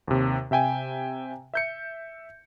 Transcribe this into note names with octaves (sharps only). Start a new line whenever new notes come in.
D#2 C3
C3 E5 G5 G#5
E5 G6 C#7